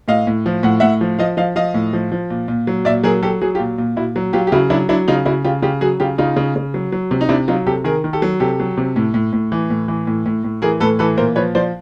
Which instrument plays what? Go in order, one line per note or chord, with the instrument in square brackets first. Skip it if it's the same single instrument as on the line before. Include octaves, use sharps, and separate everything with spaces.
[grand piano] A2 D#5 F5
A2
F3
A2 F#5
A2 E5 F#5
F3
F3 D#5 F5
F3 D#5 F5
F3 D#5 F5
A2
F3
F3
A#2
A#2
F#3
A#2 D5 E5
F#3 G#4 A#4
F#3 G4 A4
F#3 F#4 G#4
F4 G4
A#2
A#2
A#2 E4 F#4
F#3
F#3 F4 G4
G4
C#3 E4 F#4
F#3 D4 E4
F#3 D4 E4
C#3 D#4 F4
C#3 E4 F#4
C#3 F4 G4
C#3 F4 G4
F#3 F#4 G#4
C#3 F4 G4
C#3 D#4 F4
C#3
C#3
F#3
F#3
C3
D#4
C3 D4 E4
F#3 D#4 F4
C3 G4 A4
D#3 G#4 A#4
D#3
G4 A4
F#3
C3 G4 A4
F#3
C3
A2
A2
A2
E3
A2
E3
A2
A2
A2
E3 G#4 A#4
A2 A4 B4
E3 A4 B4
A#2 A#4 C5
F3 B4 C#5
F3 C5 D5